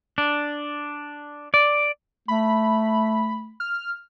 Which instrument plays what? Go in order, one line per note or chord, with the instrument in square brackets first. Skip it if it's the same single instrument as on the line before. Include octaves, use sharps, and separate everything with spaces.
[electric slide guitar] D4
D5
[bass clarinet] A3 [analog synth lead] B5
[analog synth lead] F6